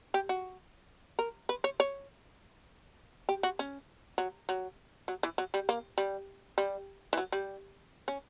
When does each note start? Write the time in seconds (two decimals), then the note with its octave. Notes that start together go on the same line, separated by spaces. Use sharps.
0.14 G4
0.29 F#4
1.19 A#4
1.49 B4
1.64 C#5
1.80 C#5
3.29 G4
3.43 F#4
3.59 C#4
4.18 F#3
4.49 F#3
5.08 F#3
5.23 E3
5.38 F#3
5.54 G3
5.69 A#3
5.98 G3
6.58 G3
7.13 E3
7.17 F#3
7.32 G3
8.08 C#4